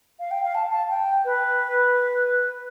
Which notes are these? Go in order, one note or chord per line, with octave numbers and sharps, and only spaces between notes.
F5
G5
F5
A5
A5
G5
B4